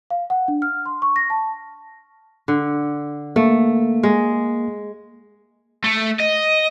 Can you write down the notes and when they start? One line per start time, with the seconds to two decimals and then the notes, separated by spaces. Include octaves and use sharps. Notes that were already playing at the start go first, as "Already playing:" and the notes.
0.10 F5
0.30 F#5
0.48 D4
0.62 F6
0.86 C6
1.02 C#6
1.16 A#6
1.30 A5
2.48 D3
3.36 A3 A#3
4.03 G#3
5.84 A3
6.20 D#5